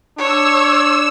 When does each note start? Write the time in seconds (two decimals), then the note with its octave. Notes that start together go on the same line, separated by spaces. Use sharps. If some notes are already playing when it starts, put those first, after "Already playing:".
0.18 D4 C#5 E6